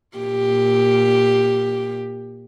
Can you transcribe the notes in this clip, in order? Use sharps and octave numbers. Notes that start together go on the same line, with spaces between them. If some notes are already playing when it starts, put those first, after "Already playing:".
A#2 G4